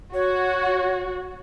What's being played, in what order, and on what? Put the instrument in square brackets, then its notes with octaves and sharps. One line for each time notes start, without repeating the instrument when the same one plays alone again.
[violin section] F#4 [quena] C#5